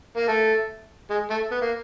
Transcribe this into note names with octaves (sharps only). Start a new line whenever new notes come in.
A#3
A3
G#3
A3
B3
A#3